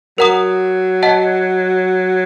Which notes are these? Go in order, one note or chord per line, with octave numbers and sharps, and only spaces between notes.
F#3 A#4 F#5 A#5 D#6
D#5 F#5 A5